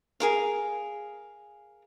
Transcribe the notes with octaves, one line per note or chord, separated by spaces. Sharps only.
G#4 A#4 F5